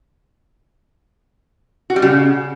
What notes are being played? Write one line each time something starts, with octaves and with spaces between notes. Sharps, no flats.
F#4
G3
C#3